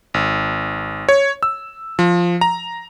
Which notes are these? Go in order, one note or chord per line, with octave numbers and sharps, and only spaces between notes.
G#1
C#5
E6
F3
A#5